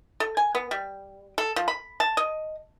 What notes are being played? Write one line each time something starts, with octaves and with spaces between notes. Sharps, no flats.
A4
G#5
B3
G3
A4
F3
B5
A5
D#5